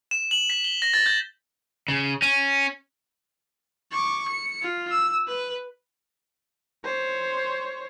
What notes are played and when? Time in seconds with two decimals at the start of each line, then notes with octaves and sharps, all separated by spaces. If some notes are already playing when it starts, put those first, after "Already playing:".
0.11 E7
0.31 F#7
0.50 B6
0.64 G7
0.82 A#6
0.94 A6
1.06 G6
1.88 C#3
2.22 C#4
3.92 C#6 D6
4.29 C#7
4.62 F4
4.91 E6
5.28 B4
6.84 C5 C#5